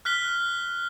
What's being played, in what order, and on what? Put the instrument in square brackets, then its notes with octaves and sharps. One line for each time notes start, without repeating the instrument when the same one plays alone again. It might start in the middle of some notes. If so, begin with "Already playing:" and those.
[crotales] F6 F#6 B6 G7